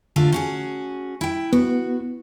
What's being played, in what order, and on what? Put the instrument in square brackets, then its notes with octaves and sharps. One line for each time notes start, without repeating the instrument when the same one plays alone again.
[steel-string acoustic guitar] D3 A3 F4
C#4 F#4 G#4
E4 G5
[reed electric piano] B3 [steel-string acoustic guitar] F#4